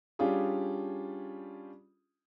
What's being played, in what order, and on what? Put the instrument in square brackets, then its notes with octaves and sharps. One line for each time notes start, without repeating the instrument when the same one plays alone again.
[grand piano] G3 C#4 D4 F4 G4 G#4